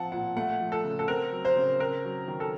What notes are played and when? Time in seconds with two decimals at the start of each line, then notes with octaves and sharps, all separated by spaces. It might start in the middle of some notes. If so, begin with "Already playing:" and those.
Already playing: F3 C4 F#5 A5
0.12 A#2 F#5
0.36 A3 F#5
0.61 F3
0.72 A4
0.84 C#3
0.99 A4
1.08 C4 A#4
1.32 F#3
1.45 C5
1.56 C#3
1.80 C4 A#4
2.05 F#3
2.28 D#3
2.40 A4